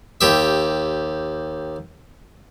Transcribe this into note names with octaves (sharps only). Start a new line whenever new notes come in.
D#2 G4 E5